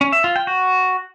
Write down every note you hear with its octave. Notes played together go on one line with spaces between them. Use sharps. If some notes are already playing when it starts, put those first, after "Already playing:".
C#4
E5
F4
G5
F#4